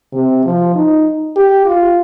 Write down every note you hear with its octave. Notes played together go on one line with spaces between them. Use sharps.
C3
F3
D#4
G4
F4